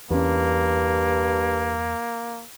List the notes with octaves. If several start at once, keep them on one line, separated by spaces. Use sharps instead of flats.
E2 G2 A#3 C#4